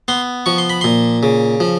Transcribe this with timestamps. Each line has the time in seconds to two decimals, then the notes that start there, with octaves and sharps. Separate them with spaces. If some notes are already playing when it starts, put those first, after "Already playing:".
0.08 B3 C6
0.46 F3 C#6
0.58 C6
0.70 B5
0.81 A#2 C6
1.23 C#3
1.60 F3